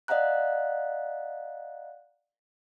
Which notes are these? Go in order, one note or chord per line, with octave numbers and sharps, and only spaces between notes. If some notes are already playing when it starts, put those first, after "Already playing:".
D5 D#5 F5 F#5 A#5 F#6